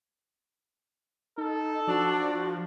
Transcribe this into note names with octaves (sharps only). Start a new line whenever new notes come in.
D#4 A4
F3 D4 F#4 D5